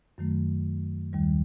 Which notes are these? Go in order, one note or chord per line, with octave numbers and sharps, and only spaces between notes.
F#2 D#3 F#3 A3
D#2 D#3 G3